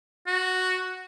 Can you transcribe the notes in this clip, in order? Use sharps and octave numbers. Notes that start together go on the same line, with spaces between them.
F#4